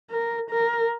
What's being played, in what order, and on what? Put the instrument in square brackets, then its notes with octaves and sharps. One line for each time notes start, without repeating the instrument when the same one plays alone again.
[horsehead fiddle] A#4
A#4